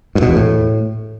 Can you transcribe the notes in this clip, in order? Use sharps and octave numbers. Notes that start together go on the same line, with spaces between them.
G2
B2
E2
A2